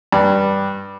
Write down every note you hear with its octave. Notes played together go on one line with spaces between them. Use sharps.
G2